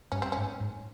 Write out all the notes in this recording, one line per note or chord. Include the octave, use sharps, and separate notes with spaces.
G2 C#4
C4
G#2 C#4
G#2